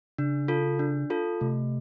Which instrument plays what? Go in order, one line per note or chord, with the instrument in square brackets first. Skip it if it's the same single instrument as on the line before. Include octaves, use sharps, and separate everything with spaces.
[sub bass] C#3 [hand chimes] D4
[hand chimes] F4 A4
D4
F4 A4
[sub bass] C3 [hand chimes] A3